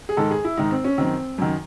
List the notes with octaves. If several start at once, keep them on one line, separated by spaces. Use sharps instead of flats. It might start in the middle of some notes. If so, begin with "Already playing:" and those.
G#4
G#2 D#3 A4
G#4
E4
G#2 D#3 D#4
C4
C#4
F#2 D#3 C4
F#2 D#3